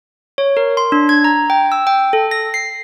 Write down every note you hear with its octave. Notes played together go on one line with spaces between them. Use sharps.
C#5
A#4
C6
D4
G#6
A#5
G5
E6
G5
A4
A#6
C7